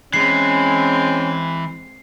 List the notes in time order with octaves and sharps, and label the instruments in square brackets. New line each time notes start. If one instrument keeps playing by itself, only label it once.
[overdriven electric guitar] E3 [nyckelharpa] G#3 C4 [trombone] C#4 [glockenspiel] C7